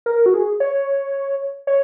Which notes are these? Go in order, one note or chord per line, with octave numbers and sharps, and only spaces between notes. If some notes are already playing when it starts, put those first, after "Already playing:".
A#4
F#4
G#4
C#5
C#5